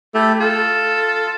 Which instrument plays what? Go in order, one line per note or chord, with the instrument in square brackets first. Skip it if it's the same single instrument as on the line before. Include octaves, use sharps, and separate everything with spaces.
[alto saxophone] A3 [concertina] E4 G4 A4
[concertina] F4 [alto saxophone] A4